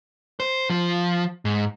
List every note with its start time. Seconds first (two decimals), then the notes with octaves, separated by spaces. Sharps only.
0.40 C5
0.70 F3
1.45 G#2